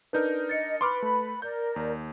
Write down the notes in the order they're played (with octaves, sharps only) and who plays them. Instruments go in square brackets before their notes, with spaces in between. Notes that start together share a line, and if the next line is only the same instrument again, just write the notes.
[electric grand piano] D4 D#4 A#4 [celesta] B4 D5 G6
[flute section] D#5 [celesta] A6 C#7
[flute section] B4 B5 [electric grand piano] C6 D6 F6
[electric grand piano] A3
[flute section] A#4 D5 [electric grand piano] G6
[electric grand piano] D#2